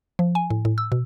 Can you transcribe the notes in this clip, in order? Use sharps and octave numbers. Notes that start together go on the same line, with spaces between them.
F3
G#5
A2
A2
E6
B2